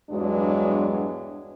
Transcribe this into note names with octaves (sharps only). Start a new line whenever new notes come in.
E2 G2 F#3 G#3 D4